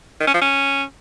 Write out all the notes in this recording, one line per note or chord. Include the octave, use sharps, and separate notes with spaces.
D#3
C#4
F3
C#4